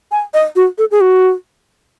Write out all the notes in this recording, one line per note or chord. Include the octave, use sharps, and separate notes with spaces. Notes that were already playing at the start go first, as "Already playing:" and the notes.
G#5
D#5
F#4
A4
G#4
F#4